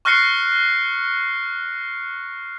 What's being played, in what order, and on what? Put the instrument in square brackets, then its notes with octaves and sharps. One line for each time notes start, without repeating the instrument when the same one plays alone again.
[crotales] C#6 F6 F#6 A#6 C7 C#7